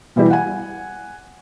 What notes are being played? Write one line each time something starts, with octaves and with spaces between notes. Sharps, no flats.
B2 E3 G3 E4 G4
F#5 G#5